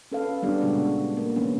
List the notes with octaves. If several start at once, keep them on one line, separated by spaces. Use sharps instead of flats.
C#4 A4 B4 F5
G3 B3 D4 G4
A#2 C#3 G#3 F#4
A#3
C3 E3 B3 C#4